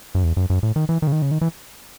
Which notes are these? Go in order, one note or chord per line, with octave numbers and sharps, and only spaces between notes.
F#2
E2
F#2
F#2
A2
D#3
E3
D#3
C#3
D#3
C#3
D#3
E3